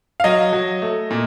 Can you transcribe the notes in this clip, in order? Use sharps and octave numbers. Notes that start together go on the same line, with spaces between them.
F5
F#3 D#5
F#3
A3
A#2